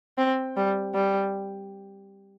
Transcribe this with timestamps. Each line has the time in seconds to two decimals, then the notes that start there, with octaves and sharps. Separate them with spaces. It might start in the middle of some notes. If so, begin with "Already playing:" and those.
0.18 C4
0.57 G3
0.94 G3